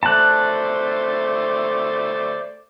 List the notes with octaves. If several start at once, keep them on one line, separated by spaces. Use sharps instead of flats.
A3 C5 D5 A5 F#6